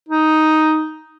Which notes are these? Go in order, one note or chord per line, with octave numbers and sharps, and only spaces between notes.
D#4